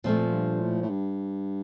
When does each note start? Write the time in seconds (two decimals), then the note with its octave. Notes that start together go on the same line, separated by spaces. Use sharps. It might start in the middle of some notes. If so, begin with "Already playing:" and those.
0.04 F2 A#2 F3 A3
0.32 G2
0.61 A2
0.82 A2
0.90 G2